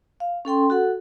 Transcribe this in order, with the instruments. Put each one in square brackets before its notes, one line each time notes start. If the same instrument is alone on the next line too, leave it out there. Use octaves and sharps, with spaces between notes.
[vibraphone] F5
C#4 A4 G5 C6
F#4 A4 F#5